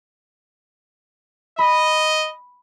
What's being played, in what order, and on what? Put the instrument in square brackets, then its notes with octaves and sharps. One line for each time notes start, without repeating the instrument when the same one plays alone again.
[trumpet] D#5 [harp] B5